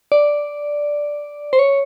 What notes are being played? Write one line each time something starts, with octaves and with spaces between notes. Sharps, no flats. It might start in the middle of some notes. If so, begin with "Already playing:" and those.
D5
C5
C#5